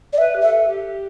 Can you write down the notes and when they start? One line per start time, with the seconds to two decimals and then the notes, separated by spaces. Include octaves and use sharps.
0.13 D5
0.18 B4 E5
0.36 G4
0.42 A4 E5
0.68 G4